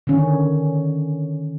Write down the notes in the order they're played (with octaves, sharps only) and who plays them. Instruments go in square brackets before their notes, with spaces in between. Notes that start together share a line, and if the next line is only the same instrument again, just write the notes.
[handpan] D3 D#3 C#4